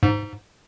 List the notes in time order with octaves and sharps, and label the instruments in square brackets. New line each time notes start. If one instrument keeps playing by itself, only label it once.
[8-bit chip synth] G#2